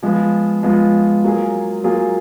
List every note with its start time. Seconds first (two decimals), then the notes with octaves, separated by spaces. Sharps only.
0.03 F3 G#3 B3 F4
0.63 F3 G#3 B3 F4
1.24 F#3 A#3 F4 G#4
1.84 F#3 A#3 F4 G#4